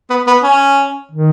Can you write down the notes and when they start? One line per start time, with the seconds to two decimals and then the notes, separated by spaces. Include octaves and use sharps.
0.10 B3
0.27 B3
0.43 C#4
1.11 D#3